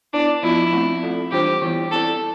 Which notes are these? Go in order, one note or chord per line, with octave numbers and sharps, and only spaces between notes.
B3 D4 E4 B4
F3 B3 E4 F4
A3 C4 E4
A3 C4 F4 A4 D5
E3 G3 D4 F4 G4 C5
E3 B3 E4 G4 D5
C4 E4 G4 A4 D5